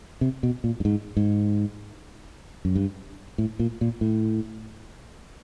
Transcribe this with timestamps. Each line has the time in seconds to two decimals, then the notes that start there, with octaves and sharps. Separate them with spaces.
0.21 C3
0.43 B2
0.64 A#2
0.80 G2
0.85 G#2
1.17 G#2
2.65 F#2
2.76 G2
3.38 A2
3.59 A#2
3.81 A#2
4.01 A2